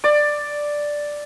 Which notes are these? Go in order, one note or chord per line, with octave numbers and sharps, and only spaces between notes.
D5